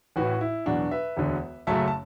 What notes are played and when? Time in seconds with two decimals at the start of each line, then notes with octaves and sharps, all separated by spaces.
0.16 A1 A2 E3 F#4 B4
0.41 E4
0.66 E2 B2 F#3 D4 F#4
0.91 B4 E5
1.17 E1 D2 D3
1.67 F#1 F#2 F#3 A3 E5 A5
1.88 A5